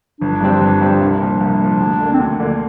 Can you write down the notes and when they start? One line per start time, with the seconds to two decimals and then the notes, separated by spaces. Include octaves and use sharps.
0.20 G1 D4
0.41 G2 G3 C4
0.61 G1
0.80 G2 G3 C4
1.01 C2 D4
1.20 A#2 F3
1.40 C2
1.60 A#2 F3
1.80 D2
2.00 D3 A#3
2.13 C4
2.20 D2 D4
2.40 D3 A#3